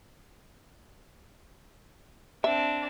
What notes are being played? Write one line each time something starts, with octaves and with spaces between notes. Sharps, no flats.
C4 D4 E5